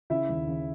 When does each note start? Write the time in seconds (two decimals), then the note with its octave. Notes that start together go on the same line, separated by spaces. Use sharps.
0.10 C#3 E4 E5
0.29 D#2
0.47 C#3